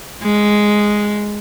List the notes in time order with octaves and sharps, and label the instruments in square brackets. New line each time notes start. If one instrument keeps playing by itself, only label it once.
[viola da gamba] G#3